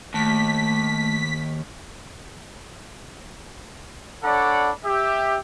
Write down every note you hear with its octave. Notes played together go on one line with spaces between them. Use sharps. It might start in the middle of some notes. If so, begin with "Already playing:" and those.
D#2 A3 B6
D4 A4 C#5 D5 F#5 B5
G4 E5